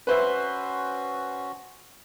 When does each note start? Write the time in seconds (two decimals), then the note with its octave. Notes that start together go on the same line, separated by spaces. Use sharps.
0.07 C#4 F#4 B4 C5 E5